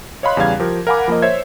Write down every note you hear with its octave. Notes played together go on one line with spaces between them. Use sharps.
C#5 D#5 F5 B5 C6 F#6
E2 C#3 G3 F5 G#6
F3 G4 A#4
A#4 F5 F#5 G#5 B5 D6
F3 A#3 A#4 D#5
C5 C#5 E5 G#6